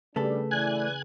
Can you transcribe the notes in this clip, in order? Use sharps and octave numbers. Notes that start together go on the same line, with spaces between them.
C#3 G3 A3 D4 G#4 A4 B4
E3 D5 G#5 F#6 G#6